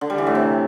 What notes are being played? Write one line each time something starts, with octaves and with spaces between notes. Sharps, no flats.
D3
G3
E3
A2
C3